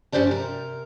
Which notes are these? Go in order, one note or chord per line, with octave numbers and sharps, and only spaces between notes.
G2 C#4 G4 C5 D5 A5
C3 A#4